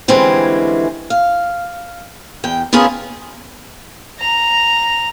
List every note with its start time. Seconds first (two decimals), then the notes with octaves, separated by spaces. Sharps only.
0.08 D3 E3 G3 G#3 C4 C#4
1.10 F5
2.44 E2 G5
2.73 B3 C#4 E4 F4 G#4 A#4
4.20 A#5